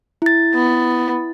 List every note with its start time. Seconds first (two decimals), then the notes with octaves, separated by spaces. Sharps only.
0.22 E4 A6
0.54 B3